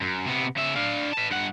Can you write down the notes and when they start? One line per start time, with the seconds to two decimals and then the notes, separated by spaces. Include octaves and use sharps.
0.01 F#2
0.26 C3 B3
0.57 C#3 E5
0.76 D4 F5
1.13 B4 A5
1.31 G2 F#5